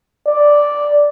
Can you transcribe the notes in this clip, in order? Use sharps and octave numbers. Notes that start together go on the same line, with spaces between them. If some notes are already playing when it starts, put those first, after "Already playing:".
D5